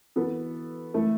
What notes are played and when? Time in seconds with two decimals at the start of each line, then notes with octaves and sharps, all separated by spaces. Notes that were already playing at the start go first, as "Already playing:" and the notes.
0.16 E3 B3 F#4 A4
0.94 E3 A3 E4 A4